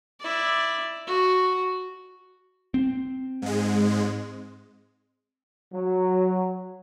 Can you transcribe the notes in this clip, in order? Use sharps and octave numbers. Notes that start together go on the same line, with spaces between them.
E4 D5
F#4
C4
G#2 G#3
F#3